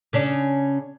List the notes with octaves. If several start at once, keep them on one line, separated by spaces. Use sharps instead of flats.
C#3 C#4 D4